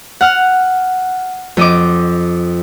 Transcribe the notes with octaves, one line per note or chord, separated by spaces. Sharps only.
F#5 F6
F2 D#5 D6